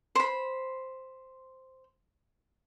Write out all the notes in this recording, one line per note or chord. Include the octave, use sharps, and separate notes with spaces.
C5 B5